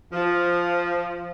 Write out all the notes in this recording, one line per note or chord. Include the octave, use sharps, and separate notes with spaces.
F3